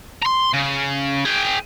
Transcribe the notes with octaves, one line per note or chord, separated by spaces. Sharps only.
A#5 C6
C#3
G#4 G5